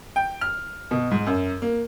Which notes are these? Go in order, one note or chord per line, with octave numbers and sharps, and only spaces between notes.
G5
F6
B2
G#2
F#2
A#3